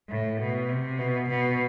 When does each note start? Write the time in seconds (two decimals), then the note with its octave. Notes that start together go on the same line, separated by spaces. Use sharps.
0.10 A2
0.40 B2
0.69 C3
0.99 B2
1.29 B2